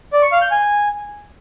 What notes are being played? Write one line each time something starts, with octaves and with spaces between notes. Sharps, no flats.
D5
C#6
F5
G6
G#5